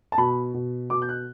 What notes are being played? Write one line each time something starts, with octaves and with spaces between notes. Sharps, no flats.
A5
B2 B5
B2
B2 D6
G6
F#6